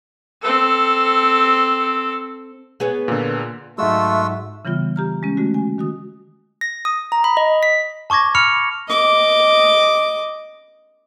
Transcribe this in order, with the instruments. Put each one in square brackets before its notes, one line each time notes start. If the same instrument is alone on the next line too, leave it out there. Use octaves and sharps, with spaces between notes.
[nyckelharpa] C4 A4
[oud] B3 G#4 C#5
[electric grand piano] A#2 D3
[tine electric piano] G#2 F#3 G#3 [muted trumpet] A3 [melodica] F4 F#4 E6 [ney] E5
[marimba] C#3 E3 G3 B3 F4
G4 A#5 F6
G#3 C#4
D3 A3 F#4
G#5
D#3 F#4 D#6
[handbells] A#6
D#6
A#5
B5
D#5
B6
[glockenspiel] A5 C#6 D6 G#6 A#6
B5 F6 C#7 F7
[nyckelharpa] D#5 D6